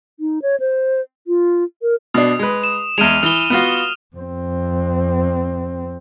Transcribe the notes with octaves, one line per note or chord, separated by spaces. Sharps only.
D#4
C#5
C5
F4
A#4
B2 D4 D#6
G#3 B4
E7
E2 G#3 F6 D#7 F7
E3 F7 G7
B3 F4 F#4
F2 C4